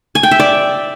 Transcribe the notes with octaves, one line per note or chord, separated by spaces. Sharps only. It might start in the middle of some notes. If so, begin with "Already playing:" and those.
G#5
G5
E5
D5